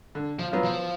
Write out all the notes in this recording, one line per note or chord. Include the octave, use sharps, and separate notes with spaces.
D3
F3
F#3 B3 F4
F3